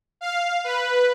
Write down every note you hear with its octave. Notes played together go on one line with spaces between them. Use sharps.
F5
B4